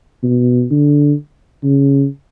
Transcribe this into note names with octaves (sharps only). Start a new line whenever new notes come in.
B2
D3
C#3